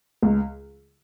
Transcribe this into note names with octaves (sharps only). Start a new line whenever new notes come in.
C#2